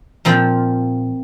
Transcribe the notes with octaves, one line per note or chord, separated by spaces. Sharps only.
A#2 F3 C4 F4